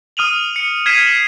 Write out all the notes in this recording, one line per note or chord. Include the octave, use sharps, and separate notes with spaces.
D#6 F6 D#7 F7 F#7
C#7
F6 G#6 B6 C7 D#7 E7
F#7